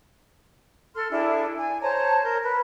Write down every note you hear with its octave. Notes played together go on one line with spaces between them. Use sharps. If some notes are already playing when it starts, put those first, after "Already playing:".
A4 C6 F6
D4 E4 G#4 A4
G#5
C5 C#5 A5 A#5
A#4 G6
B4